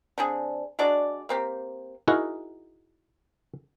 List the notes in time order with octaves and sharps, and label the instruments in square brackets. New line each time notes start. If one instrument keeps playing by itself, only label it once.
[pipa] D3 C4 G#4
G#3 D4 F#4 D5
A#3 C4 G4
[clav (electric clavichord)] D#4 E4 F#4 G#4 A#4 F#5